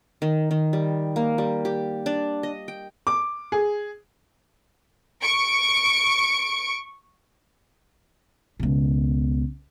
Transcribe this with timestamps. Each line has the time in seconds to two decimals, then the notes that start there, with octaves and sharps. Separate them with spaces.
0.22 D#3
0.51 D#3
0.73 G3
1.16 A#3
1.38 G3
1.65 G4
2.06 D4
2.43 D#5
2.68 G5
3.07 D6
3.52 G#4
5.22 C#6 C#7 D7
8.59 C#2 B2